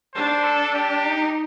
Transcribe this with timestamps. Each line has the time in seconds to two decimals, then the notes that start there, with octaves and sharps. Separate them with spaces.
0.15 D4 C5
0.44 A4
0.74 G4
1.03 D#4